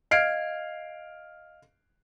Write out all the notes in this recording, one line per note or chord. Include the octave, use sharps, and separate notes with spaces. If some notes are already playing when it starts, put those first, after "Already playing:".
D#5 F5 F6 G#6 C7 D7